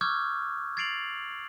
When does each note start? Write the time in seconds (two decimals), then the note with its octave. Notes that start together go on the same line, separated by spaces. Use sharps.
0.01 C#6 D6 E6 F6 G6 G#6
0.77 G#6 A6 C7 D7 F7 F#7